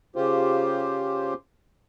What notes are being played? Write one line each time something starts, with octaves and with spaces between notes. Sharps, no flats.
C#3 F4 G4 C5